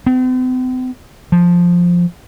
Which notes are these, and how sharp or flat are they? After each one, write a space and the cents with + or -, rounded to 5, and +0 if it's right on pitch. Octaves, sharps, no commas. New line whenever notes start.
C4 -45
F3 +5